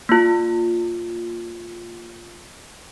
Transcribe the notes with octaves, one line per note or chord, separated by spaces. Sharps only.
A#3 F4